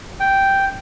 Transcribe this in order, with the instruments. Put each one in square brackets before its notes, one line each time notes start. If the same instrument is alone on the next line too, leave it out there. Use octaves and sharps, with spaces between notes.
[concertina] G5